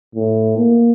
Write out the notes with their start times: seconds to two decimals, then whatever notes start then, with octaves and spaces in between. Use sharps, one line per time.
0.15 A2
0.57 A#3